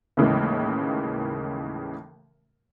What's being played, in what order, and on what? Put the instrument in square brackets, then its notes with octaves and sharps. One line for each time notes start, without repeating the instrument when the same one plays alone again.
[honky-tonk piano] D#2 A2 C#3 E3 G#3 A#3